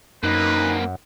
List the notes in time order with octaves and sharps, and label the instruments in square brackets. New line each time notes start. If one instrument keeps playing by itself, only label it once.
[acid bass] F#2 [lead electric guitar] A#3 C4 [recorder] D#4 [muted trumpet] B4